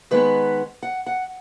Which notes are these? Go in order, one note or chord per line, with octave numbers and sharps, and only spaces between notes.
D#3 G#3 B3 B4
F#5
F#5